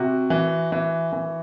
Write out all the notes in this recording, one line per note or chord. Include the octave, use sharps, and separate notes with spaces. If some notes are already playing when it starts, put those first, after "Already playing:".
Already playing: C3 F#4
E3
E3
E3